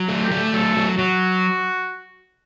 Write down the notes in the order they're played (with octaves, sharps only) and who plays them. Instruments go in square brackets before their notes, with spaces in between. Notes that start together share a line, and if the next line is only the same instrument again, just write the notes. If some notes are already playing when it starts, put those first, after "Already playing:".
Already playing: [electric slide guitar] F#3
A3
[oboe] G4
[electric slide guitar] A3
[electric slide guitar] F#3 [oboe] A4
[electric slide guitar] F#3
[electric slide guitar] F#3 [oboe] F#4